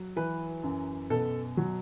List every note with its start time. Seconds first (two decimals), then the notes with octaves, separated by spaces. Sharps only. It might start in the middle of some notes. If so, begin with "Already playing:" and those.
Already playing: F#3
0.16 E3 B4
0.63 F#2
1.10 B2 A4
1.57 F#3